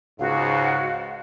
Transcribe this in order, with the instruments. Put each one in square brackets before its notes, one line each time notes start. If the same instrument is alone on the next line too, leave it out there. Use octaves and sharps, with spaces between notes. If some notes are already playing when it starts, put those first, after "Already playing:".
[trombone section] C#2 G#2 [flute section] F#4 [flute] F5